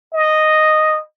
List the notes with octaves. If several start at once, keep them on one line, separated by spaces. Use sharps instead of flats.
D#5